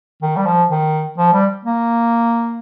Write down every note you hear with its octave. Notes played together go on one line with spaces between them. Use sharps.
D#3
G3
F3
D#3
F3
G3
A#3